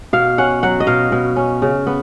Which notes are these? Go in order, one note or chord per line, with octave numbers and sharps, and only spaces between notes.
B2 F5
C#4 F#5
F#3 F#5
D#5
B2 F5
B2
C#4
C#3
B3